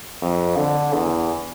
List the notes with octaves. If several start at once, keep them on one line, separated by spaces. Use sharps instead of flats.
F2
D3
E2